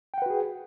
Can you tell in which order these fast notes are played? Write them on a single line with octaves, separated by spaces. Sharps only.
G5 F#5 B4 F#4 G#4